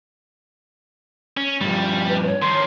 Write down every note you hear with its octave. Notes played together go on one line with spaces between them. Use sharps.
C#4
G2 F3 G3
B4
C#5
D#3 F3 C6